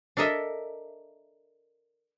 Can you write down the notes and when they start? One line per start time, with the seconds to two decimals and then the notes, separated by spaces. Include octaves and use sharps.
0.17 D4 A4 A#4 D#5 E5